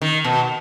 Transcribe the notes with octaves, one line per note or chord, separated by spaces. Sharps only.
D#3
B2